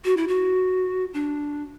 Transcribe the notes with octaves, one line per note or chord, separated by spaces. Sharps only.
F#4
E4
F#4
D4